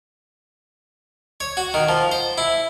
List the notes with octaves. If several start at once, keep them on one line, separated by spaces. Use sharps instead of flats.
C#5
F#4
D#3
F3
C5
E4